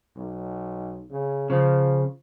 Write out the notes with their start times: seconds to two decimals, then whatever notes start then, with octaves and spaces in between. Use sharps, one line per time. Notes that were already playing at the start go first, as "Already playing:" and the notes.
0.16 B1
1.10 C#3
1.50 C#3 F3